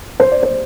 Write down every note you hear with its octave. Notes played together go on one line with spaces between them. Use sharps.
C5
D5
C5